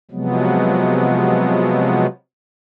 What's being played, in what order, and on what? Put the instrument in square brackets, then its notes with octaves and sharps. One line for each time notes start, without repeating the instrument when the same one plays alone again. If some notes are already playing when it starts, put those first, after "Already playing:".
[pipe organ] C3 F3 F#3 G#3 B3